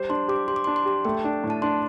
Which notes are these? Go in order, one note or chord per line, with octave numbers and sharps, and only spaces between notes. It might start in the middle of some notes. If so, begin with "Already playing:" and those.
Already playing: G3 C5
D4 C6
G4 D6
G4 C6
D6
C6
D4
C6
G4
A3 G5
D4
A2
A5
D4 C6